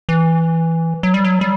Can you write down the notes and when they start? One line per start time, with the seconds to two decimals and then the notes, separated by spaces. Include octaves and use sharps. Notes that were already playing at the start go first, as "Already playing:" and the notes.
0.09 E3
1.03 F#3
1.14 G3
1.24 F#3
1.41 G3